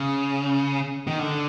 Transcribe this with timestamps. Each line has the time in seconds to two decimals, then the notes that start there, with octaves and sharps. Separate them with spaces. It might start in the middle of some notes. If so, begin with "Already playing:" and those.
Already playing: C#3
1.07 D#3
1.19 D3